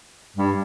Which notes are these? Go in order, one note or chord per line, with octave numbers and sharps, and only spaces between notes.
G2